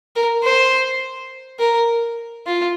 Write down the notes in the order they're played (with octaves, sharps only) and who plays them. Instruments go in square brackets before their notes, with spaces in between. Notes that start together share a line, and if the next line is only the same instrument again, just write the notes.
[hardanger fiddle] A#4
C5
A#4
F4